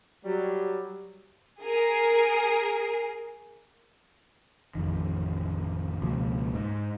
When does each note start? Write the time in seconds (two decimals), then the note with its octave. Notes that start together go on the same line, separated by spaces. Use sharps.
0.25 F#3 G3
1.62 G#4 A#4 C7
4.75 A1 F2 D#3
6.02 C#2 B2 F3 A#3
6.54 G#2